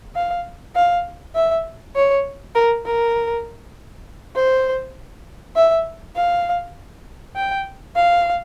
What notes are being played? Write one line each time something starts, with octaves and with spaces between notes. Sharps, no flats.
F5
F5
E5
C#5
A#4
A#4
C5
E5
F5
G5
F5